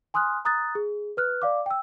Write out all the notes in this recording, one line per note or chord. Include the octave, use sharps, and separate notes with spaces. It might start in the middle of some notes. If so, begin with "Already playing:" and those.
G#5 C6 D#6 F6 F#6
A#5 D#6 F#6 A6
G#4
B4 F6 F#6
D5 F5 D6
G5 E6